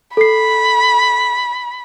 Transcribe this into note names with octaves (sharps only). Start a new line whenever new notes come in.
A4 B5 C7